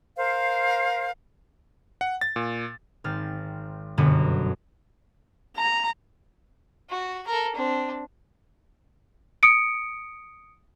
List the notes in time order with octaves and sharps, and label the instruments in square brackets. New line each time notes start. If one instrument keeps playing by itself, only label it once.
[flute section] A#4 C5 F5
[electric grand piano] F#5
A6
A#2
[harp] G#1 C4 F6 A6
G1 F#2 B2 D3 B3 C#4
[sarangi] A#5
[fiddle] F#4
A4 A#4
C4 D4
[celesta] D#6 C#7 D7